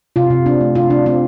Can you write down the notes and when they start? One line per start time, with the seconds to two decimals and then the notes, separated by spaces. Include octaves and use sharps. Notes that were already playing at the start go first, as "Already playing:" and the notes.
0.16 C3 F4
0.30 C3
0.46 C4 D4
0.61 A3
0.75 C3 F4
0.90 C3 D4
1.06 C4 F4